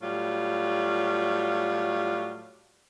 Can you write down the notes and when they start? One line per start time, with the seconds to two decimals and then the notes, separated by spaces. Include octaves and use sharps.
0.02 A2 F#3 G3 F4